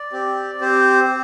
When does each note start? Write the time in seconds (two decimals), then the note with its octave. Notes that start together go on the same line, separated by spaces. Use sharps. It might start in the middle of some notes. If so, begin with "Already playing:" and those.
Already playing: D5
0.12 C4 G4
0.61 C4 G4 C5
1.08 C4